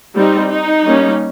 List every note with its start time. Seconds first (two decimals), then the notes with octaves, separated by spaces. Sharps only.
0.16 G3 C4 D#4
0.49 D#4
0.84 G3 A#3 C#4